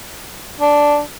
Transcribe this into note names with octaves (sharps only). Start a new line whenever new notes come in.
D4